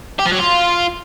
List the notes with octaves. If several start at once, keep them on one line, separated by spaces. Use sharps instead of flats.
G4
F3
F#3
F4